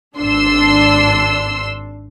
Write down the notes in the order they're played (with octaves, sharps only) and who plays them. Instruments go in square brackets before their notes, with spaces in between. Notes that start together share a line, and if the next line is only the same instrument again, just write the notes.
[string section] G#1 D4 C6 E6